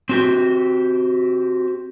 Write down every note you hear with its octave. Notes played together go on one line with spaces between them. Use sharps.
C4 F#4 G4